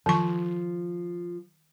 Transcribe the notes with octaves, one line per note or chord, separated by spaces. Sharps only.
D#3 F3 C#6